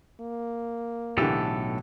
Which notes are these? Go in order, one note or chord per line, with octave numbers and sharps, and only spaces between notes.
A#3
B1 A2 D3 E3 G4 A4